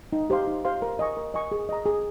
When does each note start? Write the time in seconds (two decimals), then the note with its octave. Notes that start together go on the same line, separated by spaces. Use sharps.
0.13 D#4
0.30 G4 C5 F5 C6
0.47 D#4
0.65 G4 C5 F5 C6
0.82 A#4
0.99 D#5 G#5 C#6
1.17 A#4
1.34 D#5 G#5 C#6
1.52 G#4
1.69 D#5 A#5
1.86 G#4